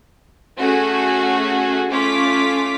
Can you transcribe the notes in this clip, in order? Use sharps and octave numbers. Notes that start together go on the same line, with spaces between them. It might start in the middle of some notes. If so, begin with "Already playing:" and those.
A3 C#4 F#4 G#4
A3 C#4 F4 D6 B6